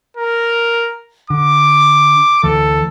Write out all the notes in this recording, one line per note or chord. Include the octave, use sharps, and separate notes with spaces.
A#4
D3 D6
D2 E3 A4